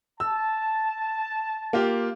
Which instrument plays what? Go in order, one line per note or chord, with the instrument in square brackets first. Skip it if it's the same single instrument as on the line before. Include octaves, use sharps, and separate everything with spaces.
[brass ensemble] A5 [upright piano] E6
[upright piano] A#3 F4 G4